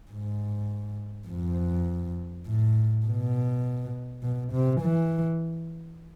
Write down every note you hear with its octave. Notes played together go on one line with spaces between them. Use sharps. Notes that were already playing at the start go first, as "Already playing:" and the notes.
G#2
F2
A2
B2
B2
C3
E3